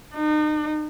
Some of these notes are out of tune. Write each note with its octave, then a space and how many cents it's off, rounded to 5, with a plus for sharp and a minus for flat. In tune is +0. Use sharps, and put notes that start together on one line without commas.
D#4 -35